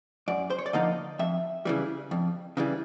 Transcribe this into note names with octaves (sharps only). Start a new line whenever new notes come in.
F#2 D5
C5
C#5
D5
D3 F3 A#3 D#4 D#5
F2 E5
C#3 E3 G3
F2
C#3 E3 G3